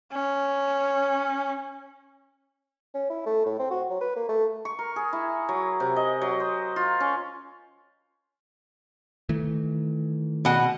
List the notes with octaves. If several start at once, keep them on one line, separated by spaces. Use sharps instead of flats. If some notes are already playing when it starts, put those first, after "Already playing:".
C#4
C#4
E4
A3
A2
C4
F#4
F#3
B4
A#3
A3
C#6
A#4
G#4
E4
F#3
C3
D#5
F#3
C5
F4
C#4
D#3 E3 A3
B2 F#5